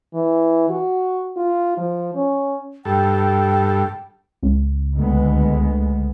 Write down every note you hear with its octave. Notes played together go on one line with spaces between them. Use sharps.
E3
F#4
F4
F3
C#4
G2 A4 G5
C#2
D2 G#3 B3